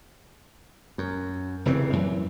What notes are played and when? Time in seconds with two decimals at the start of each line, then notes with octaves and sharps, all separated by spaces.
0.98 F#2
1.65 F1 C#3 E3 C4
1.93 F#2 E3